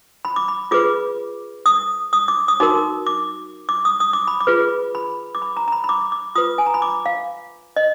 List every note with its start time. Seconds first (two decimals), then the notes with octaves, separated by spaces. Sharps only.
0.25 B5
0.36 D6
0.48 B5
0.71 F4 G#4 B4 D6
1.66 D#6
2.13 D#6
2.28 D6
2.48 D#6
2.60 D#4 F#4 A#4 D6
3.07 D6
3.69 D6
3.85 D#6
4.00 D#6
4.13 D6
4.27 B5
4.40 D6
4.47 F4 G#4 B4
4.95 B5
5.35 D6
5.42 B5
5.57 A#5
5.68 A#5
5.72 B5
5.84 B5
5.89 D6
6.12 D6
6.35 F4 B4 D#6
6.58 G#5
6.66 A#5
6.74 B5
6.82 D6
7.06 F5
7.77 D#5